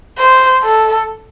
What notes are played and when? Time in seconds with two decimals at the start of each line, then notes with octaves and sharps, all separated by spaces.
0.18 C5
0.63 A4